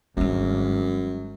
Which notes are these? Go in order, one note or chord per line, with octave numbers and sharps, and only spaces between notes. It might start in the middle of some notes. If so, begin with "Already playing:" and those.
G#1 F#2 G3 D4